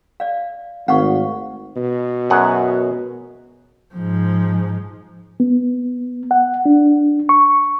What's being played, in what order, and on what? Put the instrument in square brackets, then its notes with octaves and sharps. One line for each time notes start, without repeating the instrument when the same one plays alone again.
[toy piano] D5 F5
[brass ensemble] G#1 [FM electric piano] A3 C4 F5 [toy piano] F#5 C#6
[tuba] B2
[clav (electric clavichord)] F#2 G#4 F#5
[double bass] G#2 F3
[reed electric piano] B3
F#5
D4
C#6